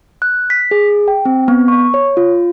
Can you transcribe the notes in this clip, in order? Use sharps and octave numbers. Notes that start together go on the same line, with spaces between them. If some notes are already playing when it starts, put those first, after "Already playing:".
F#6
B6
G#4
G5
C4
B3
C#6
C#5
F4